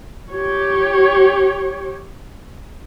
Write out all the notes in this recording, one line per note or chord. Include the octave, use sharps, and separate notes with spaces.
G4 C#5